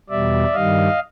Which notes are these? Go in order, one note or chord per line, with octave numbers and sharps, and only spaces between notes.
E2 B2 G3 D5 E5
G2 D#3 G3 D#5 F5